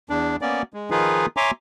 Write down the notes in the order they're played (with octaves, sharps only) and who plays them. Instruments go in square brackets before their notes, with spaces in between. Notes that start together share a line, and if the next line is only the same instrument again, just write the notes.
[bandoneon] E2 D4
A#3 B3 C#4 D5
G#3
D#3 F3 D#4 F4 G#4 B4
C#5 E5 G#5 A#5 C6 D6